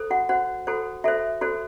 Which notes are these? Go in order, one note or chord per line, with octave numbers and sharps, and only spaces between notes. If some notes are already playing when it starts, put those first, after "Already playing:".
Already playing: A4 C5
F#4 F#5
F#4 C5 F#5
F#4 A4 C5
F#4 A4 C5 E5
F#4 A4 C5